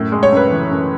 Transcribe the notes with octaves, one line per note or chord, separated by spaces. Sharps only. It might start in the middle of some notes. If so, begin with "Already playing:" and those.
Already playing: F#2 A2
G#3
C#5
F#2 B4
E3
F#2